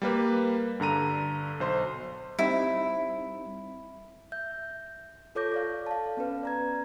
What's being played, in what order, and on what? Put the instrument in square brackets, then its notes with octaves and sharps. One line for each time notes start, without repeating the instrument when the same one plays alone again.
[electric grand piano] G3 A#3 B4
G2 D3 A#5 D#7
B1 C5 C6
[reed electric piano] G3 C4 D#4 [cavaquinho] E4
[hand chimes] E5 G6
F4 A4 C#5 D6 G6 A#6
A4 D5 F5
F5 A5
B3 C#4 B4
D5 A#5 G#6